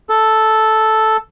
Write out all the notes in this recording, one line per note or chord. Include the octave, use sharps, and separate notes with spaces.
A4